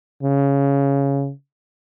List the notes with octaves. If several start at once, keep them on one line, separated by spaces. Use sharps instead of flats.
C#3